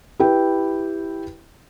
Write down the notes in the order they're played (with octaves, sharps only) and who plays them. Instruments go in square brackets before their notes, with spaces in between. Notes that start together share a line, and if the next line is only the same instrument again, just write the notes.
[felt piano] E4 G4 B4 G5